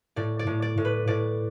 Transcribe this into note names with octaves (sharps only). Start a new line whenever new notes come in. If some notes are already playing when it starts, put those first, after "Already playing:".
A2 D5
D5
A2
D5
A2
B4
A2 D5